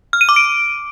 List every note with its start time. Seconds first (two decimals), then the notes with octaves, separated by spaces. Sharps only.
0.13 F6
0.21 D#7
0.29 D6
0.36 D7